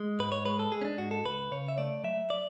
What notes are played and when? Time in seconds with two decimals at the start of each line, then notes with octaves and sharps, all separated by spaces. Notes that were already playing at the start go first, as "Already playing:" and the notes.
Already playing: G#3
0.19 G#2 B4
0.32 C#5
0.45 G#3 B4
0.59 A4
0.72 G#3 G#4
0.81 C#4
0.85 D4
0.98 G#2 F#4
1.11 A4
1.25 C#2 B4
1.51 C#3 C#5
1.68 E5
1.78 A3 D5
2.04 F#3 E5
2.30 D5